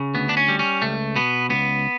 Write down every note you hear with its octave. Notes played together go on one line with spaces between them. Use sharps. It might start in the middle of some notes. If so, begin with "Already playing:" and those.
Already playing: C#3
D2 B3
D4
C#4
G3
C#4
C#2 A3
B2 B3
C#2 B3